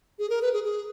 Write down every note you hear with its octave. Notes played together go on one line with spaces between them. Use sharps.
G#4
A#4
B4
G#4
G#4